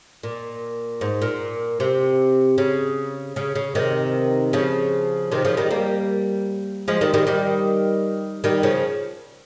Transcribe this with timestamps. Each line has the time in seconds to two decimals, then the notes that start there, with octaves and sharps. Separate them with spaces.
0.23 A#2
1.01 G#2
1.22 A#2
1.80 C3
2.58 C#3
3.36 C#3
3.55 C#3
3.75 C3 D#3
4.53 C#3 F3
5.31 C3 D#3
5.45 C#3 F3
5.57 D#3 G3
5.71 G3 A#3
6.88 F3 G#3
7.01 D#3 G3
7.14 D#3 G3
7.27 D#3 G3
8.44 D#3 G3
8.63 C#3 F3